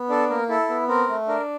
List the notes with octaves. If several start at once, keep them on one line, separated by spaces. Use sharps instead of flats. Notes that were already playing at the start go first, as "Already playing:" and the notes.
Already playing: B3
D4 A4
A#3 A#4
E4 A4
B3
C4 A#4
A3
D4 A#4